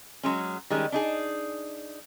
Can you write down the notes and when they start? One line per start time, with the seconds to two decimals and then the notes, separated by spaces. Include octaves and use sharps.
0.23 F#3 G#3 C#4
0.70 D#3 G3 G#3 C#4
0.92 D4 D#4 G#4